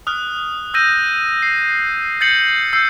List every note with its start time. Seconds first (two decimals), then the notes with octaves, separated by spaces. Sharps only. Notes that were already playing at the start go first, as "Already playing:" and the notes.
0.07 D#6 F6 F#6
0.74 E6 G6 A#6 D#7
1.43 C7
2.21 G6 A6 C7 C#7 F#7
2.73 E6 G6 C7